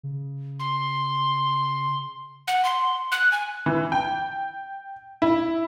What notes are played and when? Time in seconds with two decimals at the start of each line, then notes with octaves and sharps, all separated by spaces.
0.03 C#3
0.59 C6
2.48 F#5
2.65 C6
3.12 F#6
3.32 G#5
3.66 E3
3.92 G5
5.22 E4